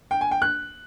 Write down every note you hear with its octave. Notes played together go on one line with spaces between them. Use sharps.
G5
G#5
G5
F#6